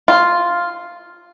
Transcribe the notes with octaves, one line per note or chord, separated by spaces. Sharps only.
F4